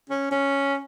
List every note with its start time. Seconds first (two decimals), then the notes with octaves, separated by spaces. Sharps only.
0.10 C#4
0.31 C#4